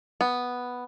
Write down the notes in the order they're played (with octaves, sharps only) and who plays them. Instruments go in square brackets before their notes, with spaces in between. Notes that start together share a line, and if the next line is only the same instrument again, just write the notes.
[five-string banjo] B3